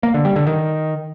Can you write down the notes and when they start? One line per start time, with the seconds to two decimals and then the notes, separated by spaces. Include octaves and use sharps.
0.03 A#3
0.14 D3
0.25 G3
0.36 D3
0.47 D#3